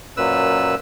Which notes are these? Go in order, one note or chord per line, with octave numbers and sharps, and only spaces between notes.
F#2 A#2 B4 E6